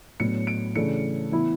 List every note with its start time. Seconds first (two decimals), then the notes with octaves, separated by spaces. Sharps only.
0.20 A2 F#3 B3 D4 C#7
0.47 D7
0.76 C#3 E3 A3 D4 C#7
1.32 E3 B3 E4